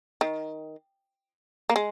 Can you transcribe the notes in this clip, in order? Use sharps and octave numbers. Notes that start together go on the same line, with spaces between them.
D#3
A#3
G#3